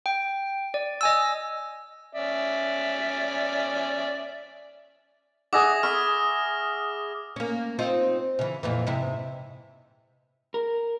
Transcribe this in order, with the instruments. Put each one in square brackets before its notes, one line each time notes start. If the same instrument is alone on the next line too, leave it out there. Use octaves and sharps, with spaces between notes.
[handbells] G5
D5
D#5 G#5 E6
[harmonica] C#4 D5 E5
[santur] G#4 E5 F#5 [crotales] D6 D#6 A#6
[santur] E5 B5 C#6 [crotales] F6
[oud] A#3 C#4
C4 D#4 F4
C#3 E3
F2 A#2 E3
G#2 C3 E4
[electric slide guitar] A#4